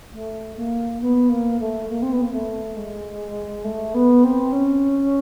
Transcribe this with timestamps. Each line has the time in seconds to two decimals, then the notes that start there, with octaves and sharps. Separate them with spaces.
0.12 A3
0.56 A#3
1.01 B3
1.29 A#3
1.59 A3
1.89 A#3
2.02 C4
2.12 B3
2.22 A#3
2.32 A3
2.77 G#3
3.64 A3
3.94 B3
4.23 C4
4.52 C#4